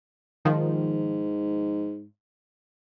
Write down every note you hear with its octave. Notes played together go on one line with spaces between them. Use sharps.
G#2 D#3 F3